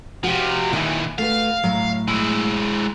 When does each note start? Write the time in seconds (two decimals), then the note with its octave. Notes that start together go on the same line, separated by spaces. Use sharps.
0.24 C3 F3 F#4 G4
0.73 A#2 D#3 E3 D#4 E4
1.18 A3 F#4 B4 F5
1.63 A2 F#3 A#5
2.08 G#3 E4